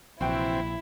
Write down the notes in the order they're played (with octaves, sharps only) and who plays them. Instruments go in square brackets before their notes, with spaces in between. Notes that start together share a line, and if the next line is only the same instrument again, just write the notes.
[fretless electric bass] A#1 [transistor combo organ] C3 E3 C4 [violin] E4 [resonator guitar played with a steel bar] F#4 G5